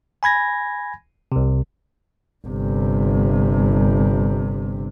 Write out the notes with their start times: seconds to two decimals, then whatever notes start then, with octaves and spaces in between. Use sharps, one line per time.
0.23 G#5 B5 G#6 A#6
1.32 C2 C3
2.47 G1 C3